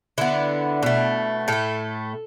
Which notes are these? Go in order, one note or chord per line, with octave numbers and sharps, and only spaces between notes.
D3 B3 E4
B2 A3
A2 A3 A4